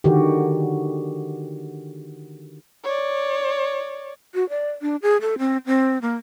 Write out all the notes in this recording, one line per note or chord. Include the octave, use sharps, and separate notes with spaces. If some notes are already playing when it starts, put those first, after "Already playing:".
D3 D#3 F#4 G4
C#5 D5
F#4
D5
D4
G#4
A4
C4
C4
A#3